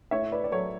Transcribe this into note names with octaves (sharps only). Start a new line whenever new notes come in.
A2 C#5 E5
B4 D5
D5
F#3 A4 C#5